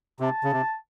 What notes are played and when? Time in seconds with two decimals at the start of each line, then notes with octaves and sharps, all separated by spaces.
0.20 C3 A5
0.44 C#3
0.52 C3